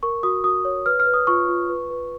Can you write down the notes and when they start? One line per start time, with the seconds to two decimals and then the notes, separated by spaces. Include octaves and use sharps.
0.03 A#4 C#6
0.23 F#4 D#6
0.44 F#4 D#6
0.65 C#5
0.86 B4 F6
1.00 F6
1.07 B4
1.14 D#6
1.27 F4 C#6
1.49 F4
1.69 B4
1.90 B4